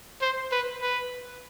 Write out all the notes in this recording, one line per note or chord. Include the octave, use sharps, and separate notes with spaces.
C5
B4
B4